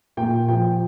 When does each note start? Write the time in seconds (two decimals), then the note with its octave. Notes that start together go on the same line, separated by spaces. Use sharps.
0.17 A#2 G5
0.48 F3 G5